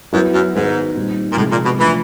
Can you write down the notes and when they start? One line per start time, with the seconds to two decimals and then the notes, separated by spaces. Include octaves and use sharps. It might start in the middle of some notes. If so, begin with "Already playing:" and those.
0.13 F#2 F#3 B3 E4
0.33 F#2
0.54 G#2 D#3 F#3 B3
0.95 A#2 G3 C4 D#4
1.33 A#2
1.37 A2 C3 F3 G#3
1.51 A#2
1.65 B2
1.78 E3 F3 A3 D4